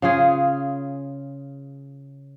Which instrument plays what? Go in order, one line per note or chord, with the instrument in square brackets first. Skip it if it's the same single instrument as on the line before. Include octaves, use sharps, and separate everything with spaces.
[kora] C#3 F4 G#4